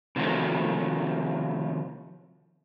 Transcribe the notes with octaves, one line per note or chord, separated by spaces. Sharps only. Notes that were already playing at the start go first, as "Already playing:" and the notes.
C3 D#3 F3 F#3 A3